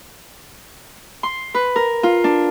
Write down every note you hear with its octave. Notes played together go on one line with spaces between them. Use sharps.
C6
B4
A#4
F4
D4